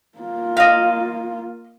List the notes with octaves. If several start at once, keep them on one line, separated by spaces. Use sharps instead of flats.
A#3 F4
D#5 F5